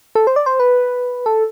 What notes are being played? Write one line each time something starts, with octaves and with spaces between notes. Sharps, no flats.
A4
C5
D5
C5
B4
A4